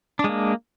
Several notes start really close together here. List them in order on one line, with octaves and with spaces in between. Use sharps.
D4 G#3 A#3